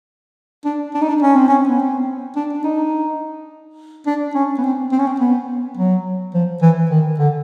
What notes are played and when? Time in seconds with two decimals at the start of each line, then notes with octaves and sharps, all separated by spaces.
0.65 D4
0.94 D4
1.02 D#4
1.09 D4
1.22 C#4
1.36 C4
1.49 C#4
1.69 B3
1.79 C4
2.36 D4
2.53 D4
2.64 D#4
4.07 D4
4.35 C#4
4.58 B3
4.64 C4
4.92 C4
4.99 C#4
5.07 C4
5.20 B3
5.77 F#3
6.34 F3
6.62 E3
6.91 D#3
7.19 D3